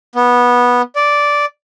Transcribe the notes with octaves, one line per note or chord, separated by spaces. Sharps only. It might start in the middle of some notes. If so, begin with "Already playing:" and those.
B3
D5